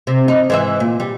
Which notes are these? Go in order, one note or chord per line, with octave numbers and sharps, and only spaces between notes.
C3
D#4
G#2 E3 E5
A#2
G3